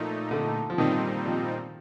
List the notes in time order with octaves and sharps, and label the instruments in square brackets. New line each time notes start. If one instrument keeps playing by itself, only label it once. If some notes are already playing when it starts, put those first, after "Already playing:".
Already playing: [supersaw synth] A#2 A3 D#4 [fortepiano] F3
[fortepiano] D3
F3
[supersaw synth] A#2 G3 C4 D#4 [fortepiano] D#3
[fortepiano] F3